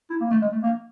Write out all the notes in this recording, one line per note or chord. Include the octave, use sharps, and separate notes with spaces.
E4
A#3
A3
G#3
A3
A#3